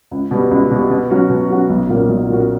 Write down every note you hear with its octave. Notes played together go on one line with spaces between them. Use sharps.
C#2
B2 G3
C#2
B2 G3
B2
F#3 C#4 F#4
B2
F#3 C#4 F#4
B1
A#2 A#3 C#4 F#4
B1
A#2 A#3 C#4 F#4